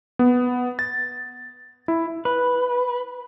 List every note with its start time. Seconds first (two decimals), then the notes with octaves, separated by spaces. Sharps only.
0.19 B3
0.79 A6
1.88 E4
2.25 B4